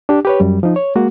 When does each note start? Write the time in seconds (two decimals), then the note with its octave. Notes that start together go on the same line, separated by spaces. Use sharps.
0.09 D4 G4
0.25 G4 B4 C#5
0.40 F#2 G3
0.63 F3 D#4
0.76 C#5
0.95 G#3 A#3 F#4